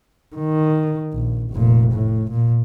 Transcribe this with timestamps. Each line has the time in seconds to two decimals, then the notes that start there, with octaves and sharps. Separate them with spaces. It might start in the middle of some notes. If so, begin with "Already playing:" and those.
0.36 D#3
1.13 A#1
1.52 F1 A#2
1.93 A2
2.31 A#2